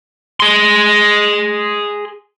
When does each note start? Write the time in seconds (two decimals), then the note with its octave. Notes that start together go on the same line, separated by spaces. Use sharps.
0.40 G#4 C6